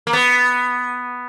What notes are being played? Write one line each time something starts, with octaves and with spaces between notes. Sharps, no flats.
A#3
B3